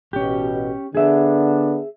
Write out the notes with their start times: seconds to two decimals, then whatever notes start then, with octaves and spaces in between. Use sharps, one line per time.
0.13 A1 B2 C#4 G4
0.95 D3 B3 D4 G#4 E5